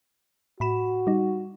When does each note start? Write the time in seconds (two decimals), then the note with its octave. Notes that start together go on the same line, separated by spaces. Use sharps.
0.60 A2 F#4 B5 E7
1.07 G3 D#4